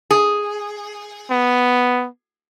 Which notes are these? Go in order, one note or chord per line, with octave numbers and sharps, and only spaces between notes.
G#4
B3